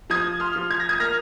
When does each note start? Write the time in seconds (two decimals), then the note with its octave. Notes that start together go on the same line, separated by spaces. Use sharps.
0.10 F3 D#6 G#6
0.40 C6 F6
0.56 F3
0.70 G#6
0.80 A#6
0.89 D#6 G#6
1.00 A#3 F6 A#6